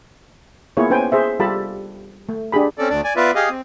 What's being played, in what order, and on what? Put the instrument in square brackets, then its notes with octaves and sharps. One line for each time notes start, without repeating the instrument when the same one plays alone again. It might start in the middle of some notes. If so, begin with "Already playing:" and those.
[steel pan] A#3 B3 E4 F4 G#4 C#5
C#4 B4 C5 G5 G#5
G#4 C5 E5
G3 F4 G4 A4 A5 B5
A3
D4 G4 G#4 B5
[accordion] C4 C#4 A4 D5
D2 D4 D5
D5 G#5
B3 F4 B4 D5 E5
G4 G#4 D#5 F5
C4